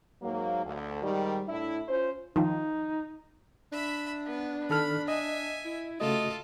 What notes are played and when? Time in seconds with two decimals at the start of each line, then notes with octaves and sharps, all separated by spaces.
0.22 G#2 F#3 A#3
0.65 D2
1.02 G#2 D#3 G3
1.48 A2 D4 E4
1.88 C#4 F4 C5
2.36 D#3 F3 D#4
3.72 D4 E5 B5
4.25 B3
4.70 D#3 A4 B5 F6
5.08 D#5 E5 G#5
5.65 E4
6.00 C#3 A3 F4 F#4 A4 D#5